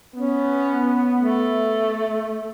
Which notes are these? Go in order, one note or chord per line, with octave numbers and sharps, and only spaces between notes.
B3 C#4
A3